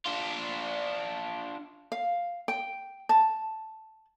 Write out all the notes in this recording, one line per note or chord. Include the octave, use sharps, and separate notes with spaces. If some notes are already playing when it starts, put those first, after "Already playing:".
D4 F4
F5
G5
A5